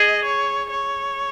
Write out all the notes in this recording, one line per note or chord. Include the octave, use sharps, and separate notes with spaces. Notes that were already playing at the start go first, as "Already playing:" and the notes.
Already playing: G#4 D#5
C#5
C#5